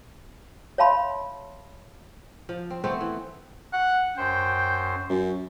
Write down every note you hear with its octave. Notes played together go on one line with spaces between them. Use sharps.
C#5 E5 F5 A5 B5 C6
F3
C4
A3 B3 C4 C5
E3
F#5
F#2 C5 G5
F#2